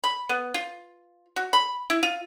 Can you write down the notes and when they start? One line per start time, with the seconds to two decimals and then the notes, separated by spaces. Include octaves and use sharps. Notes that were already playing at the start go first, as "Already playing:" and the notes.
0.04 B5
0.29 B3
0.54 F4
1.36 F#4
1.53 B5
1.90 E4
2.03 F4